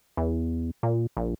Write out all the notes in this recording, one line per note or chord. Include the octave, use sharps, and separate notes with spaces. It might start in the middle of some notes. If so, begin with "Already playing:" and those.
E2
A#2
A#1